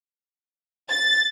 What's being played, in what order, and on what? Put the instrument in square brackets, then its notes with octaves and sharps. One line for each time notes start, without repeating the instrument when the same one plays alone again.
[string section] A6